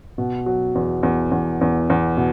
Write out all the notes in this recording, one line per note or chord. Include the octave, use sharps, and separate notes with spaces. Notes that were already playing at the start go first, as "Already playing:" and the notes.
B2
F#3
E2
E2
E2
E2
E2
B2